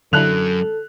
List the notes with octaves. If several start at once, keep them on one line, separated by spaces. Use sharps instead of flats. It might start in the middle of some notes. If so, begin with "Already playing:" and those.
F#2 D3 F#3 D4 E4 A4 F#6 F7